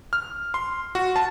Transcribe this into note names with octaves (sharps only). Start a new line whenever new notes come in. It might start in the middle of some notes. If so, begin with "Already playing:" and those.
F6
C6
F#4
A5